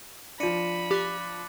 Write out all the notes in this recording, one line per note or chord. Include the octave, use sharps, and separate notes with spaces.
F3 D4 B5 A#6 C#7 D#7
G4 D6 F#6 A6